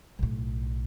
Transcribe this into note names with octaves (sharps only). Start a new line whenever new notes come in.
B1 A2